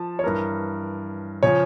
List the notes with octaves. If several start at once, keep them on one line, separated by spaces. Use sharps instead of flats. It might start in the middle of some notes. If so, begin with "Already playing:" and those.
Already playing: F3 A5
C#5
G2 E3 A#4
C#3 F3 C#5